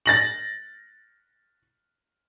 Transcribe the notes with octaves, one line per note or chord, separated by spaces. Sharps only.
A6 A#6 F#7